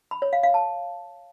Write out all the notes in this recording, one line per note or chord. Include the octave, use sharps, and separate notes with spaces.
B5
C#5
F5
F5
A5